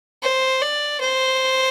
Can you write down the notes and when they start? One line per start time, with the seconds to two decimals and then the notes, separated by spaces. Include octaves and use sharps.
0.22 C5
0.62 D5
1.01 C5